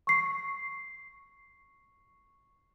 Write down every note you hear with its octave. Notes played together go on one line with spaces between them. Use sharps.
C#6 C7